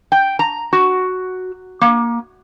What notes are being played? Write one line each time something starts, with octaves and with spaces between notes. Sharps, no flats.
G5
A#5
F#4
A#3